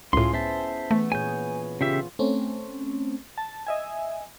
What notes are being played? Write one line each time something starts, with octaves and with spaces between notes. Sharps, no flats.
C#2 A2 C#4 E4 F4 G#4 C6
B3 C5 E5 A5
E3 A3 B3
A#2 G#4 C#5 G#5 G6
C#3 F4 G4 E5
A3 C4 C#4
A5
D#5 E5 G#5